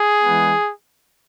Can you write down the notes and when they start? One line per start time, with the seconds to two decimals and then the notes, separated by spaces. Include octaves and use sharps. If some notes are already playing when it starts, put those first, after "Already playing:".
Already playing: G#4
0.24 E3 G#3 B3